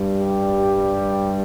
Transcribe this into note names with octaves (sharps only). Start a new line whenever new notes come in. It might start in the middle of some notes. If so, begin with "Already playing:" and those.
Already playing: G2 G3
G4